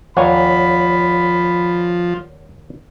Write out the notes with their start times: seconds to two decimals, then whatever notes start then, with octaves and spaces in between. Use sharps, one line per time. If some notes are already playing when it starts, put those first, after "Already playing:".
0.17 D#2 F3 C#5 D5 F#5 G#5 A#5 B5